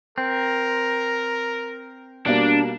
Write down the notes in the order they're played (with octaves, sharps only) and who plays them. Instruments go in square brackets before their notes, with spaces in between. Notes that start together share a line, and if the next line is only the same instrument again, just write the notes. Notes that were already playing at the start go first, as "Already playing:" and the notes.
[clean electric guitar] C4 [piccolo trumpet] A#4
[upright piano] B2 G3 A#3 [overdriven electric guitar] D4